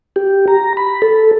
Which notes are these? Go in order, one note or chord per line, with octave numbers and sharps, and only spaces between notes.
G4
A#5
B5
A4